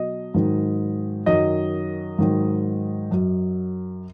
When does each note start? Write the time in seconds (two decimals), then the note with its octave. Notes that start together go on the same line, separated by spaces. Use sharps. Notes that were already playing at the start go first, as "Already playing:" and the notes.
Already playing: B2 F#3 D#5
0.34 G#2 D#3 F#3
1.26 F#2 D#3 F#3 D#5
2.19 G#2 D#3 F#3
3.11 F#2 F#3